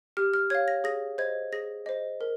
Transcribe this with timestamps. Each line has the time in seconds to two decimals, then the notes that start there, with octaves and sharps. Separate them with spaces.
0.17 G4 F6
0.34 F6
0.50 C#5 F5 G#6
0.68 A#6
0.84 G#4 A#6
1.18 C5 D#5 G#6
1.52 G#4 A#6
1.86 C5 D#5
2.21 A#4